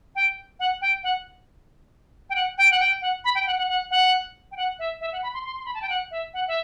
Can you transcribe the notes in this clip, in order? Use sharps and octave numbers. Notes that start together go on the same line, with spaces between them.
G5
F#5
G5
F#5
G5
F#5
G5
F#5
G5
F#5
B5
G5
F#5
F#5
F#5
F#5
G5
F#5
E5
E5
F#5
B5
C6
C6
C6
B5
A5
G5
F#5
E5
F#5
E5